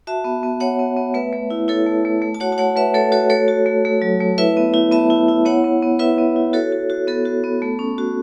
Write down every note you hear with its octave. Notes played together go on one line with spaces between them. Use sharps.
F#4 E5 A5
B3
B3
B3 C#5 F#5
B3
B3
A3 B4 E5
A3
E4
E4 A4 C#5
A3
A3
A3
A5
F#4 C#5 F#5
A5
A3 C#5 F#5
A3 B4 E5
A3 A4 C#5
F#4 A4 C#5
A3 A4 C#5
F#4
A3
A3
F#3
A3
E4 B4 E5
B3
E4
B3 E5 A5
E4
E4
B3 C#5 F#5
B3
B3
E4 B4 E5
B3
E4
F#4 A4 C#5
F#4
F#4
B3 A4
F#4
B3
A3
C#4
F#4